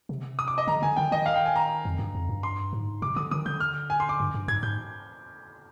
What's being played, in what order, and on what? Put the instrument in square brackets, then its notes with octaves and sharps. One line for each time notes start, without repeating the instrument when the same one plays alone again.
[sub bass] C3
[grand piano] D#6
D6
D#5
[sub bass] D3 [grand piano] A#5
[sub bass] D3 [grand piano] G#5
[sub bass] D#3 [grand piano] G5
[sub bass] D#3 [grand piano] D#5
[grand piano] F5
G5
G#5
A#5
[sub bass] F2
G2
F2
G2
[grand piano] C6
[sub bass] G#2
[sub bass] C3 [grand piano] D6
[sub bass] D3 [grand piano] D#6
[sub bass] D#3 [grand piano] D#6
[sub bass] D3 [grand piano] G6
[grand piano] F6
G#5
C6
D6
[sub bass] G2
G2
[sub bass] G#2 [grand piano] G#6
[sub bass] G#2 [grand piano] G6